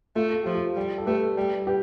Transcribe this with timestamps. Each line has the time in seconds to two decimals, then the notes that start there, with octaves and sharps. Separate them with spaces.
0.16 A3 F4 A4
0.31 A4
0.43 F3 G4
0.55 F4 A4
0.77 G3
0.98 A4
1.06 A3 G4 B4
1.37 G3
1.67 G4 B4